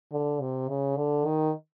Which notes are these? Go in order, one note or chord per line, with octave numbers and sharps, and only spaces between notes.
D3
C3
C#3
D3
D#3